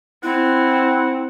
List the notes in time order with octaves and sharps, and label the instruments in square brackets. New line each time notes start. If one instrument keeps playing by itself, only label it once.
[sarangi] C4 [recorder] E4 [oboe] F#5